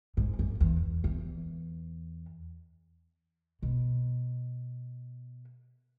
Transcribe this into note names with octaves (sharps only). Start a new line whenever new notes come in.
G#2
F#2
E2
E2
B2